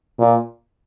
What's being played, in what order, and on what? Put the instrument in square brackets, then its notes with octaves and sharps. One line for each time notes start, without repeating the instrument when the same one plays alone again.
[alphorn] A#2